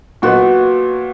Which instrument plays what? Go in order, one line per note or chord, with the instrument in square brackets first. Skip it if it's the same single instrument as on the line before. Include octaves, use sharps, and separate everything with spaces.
[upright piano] A#2 F#3 B3 [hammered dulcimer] F#4